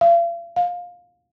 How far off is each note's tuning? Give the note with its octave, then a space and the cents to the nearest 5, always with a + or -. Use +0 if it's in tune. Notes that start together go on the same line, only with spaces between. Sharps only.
F5 -40
F5 +20